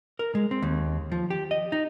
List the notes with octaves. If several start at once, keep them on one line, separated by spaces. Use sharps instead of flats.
A#4
G#3
C4
D#2
F3
G4
D#5
D#4